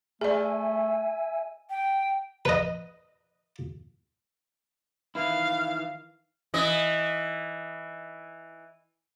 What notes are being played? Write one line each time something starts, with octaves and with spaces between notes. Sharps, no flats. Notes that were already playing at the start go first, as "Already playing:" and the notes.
A3 G#4 D5 E5 G#5
G5
B4 D#5
D#3 E3 E4 F5
E3 D#5